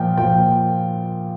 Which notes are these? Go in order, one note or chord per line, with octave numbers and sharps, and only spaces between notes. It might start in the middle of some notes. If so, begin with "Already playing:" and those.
Already playing: A#2 F3 G5
A#2 F3 G5